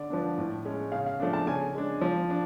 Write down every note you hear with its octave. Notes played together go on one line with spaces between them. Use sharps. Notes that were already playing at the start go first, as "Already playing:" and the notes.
Already playing: D3 D5
F3 B3 D4
A2
G#3 C#4
C#3 F5
F5
F3 A3 D4
A5
C#3 G#5
G#3 D4
F3
D4